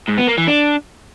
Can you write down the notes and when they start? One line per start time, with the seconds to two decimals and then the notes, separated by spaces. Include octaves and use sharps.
0.09 G#2
0.18 B3
0.28 A#3
0.38 E3
0.48 D4